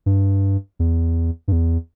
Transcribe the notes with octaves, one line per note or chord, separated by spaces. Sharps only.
G2
E2
G2
E2